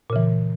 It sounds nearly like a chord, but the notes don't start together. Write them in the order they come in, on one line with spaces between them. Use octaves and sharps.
A#2 C#3 E3